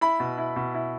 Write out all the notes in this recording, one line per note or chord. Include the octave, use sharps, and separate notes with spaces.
E4 B5
B2
E4
B2
E4